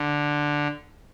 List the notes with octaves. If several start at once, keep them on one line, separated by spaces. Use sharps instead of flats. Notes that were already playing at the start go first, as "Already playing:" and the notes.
Already playing: D3